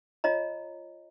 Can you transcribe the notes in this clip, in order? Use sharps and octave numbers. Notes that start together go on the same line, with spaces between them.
F4 C#5 D#5 A#5